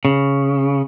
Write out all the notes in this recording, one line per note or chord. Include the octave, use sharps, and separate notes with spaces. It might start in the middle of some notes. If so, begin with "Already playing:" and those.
C#3